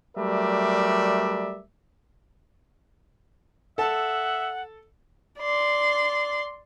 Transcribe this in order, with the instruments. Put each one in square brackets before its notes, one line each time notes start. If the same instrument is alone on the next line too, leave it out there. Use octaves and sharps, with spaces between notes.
[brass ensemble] F#3 G3 A3 A#4 D5 E5
[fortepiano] A4 A5 [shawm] E5 [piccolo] F#5
[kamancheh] D5 C6